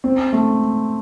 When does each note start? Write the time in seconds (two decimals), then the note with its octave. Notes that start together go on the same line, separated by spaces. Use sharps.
0.04 C4
0.33 A3